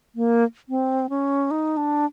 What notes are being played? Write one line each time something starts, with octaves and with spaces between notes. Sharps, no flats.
A#3
C4
C#4
D#4
D4